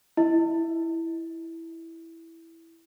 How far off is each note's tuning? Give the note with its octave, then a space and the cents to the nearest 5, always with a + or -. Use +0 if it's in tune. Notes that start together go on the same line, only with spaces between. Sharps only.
E4 +0 D#5 +20